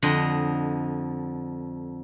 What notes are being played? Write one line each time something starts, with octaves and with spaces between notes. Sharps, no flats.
F2 D3 D#5